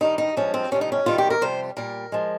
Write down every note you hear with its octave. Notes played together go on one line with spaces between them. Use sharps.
G2 D#3 G3 D#4
D#4
G2 F3 G#3 C#4
C4
F2 C3 D#3 G3 C#4
D#4
C#4
C3 D#3 G3 F4
G4
A#4
F2 C3 G3 C5
A#2 G3 A#4
F3 G#3